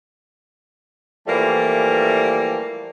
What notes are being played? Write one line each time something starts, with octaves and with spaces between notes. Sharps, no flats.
E3 F3 G3 A3 A#3